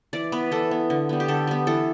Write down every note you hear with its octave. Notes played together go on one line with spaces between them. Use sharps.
E3 D5
B3 B4
E3 A4
B3
D3
G3 B3
G4
D3 A4
G3 B3
E3 A4